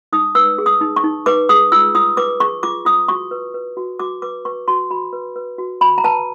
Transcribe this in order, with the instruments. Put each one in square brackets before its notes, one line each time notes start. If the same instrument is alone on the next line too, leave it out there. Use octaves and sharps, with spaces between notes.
[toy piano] D#4 D#6
B4 E6
G#4
D#6
D#4
C#6
D#4
B4 D6
G#4 D#6
F4 E6
F4 D#6
B4 D6
G#4 C#6
F4 D6
F4 D#6
F#4 C#6
B4
B4
F#4
F#4 D6
B4 D6
B4 C#6
F#4 C6
F#4 B5
B4
B4
F#4
F#4 B5
A#5
B4 A5